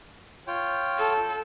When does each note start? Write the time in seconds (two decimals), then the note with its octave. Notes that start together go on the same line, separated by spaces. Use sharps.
0.47 F4 C#5 G5
0.98 A4